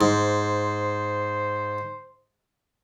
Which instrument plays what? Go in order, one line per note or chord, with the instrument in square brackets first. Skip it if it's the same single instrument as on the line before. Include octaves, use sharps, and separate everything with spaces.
[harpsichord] G#2 [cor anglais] C5